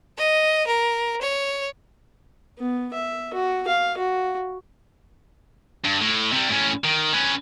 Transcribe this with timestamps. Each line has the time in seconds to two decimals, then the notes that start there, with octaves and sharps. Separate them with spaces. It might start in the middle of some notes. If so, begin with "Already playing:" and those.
0.18 D#5
0.67 A#4
1.21 C#5
2.59 B3
2.94 E5
3.34 F#4
3.68 F5
3.98 F#4
5.85 G2
6.01 A2
6.33 C3 G3
6.49 A2 C#4
6.84 D#3
7.13 C#4 B4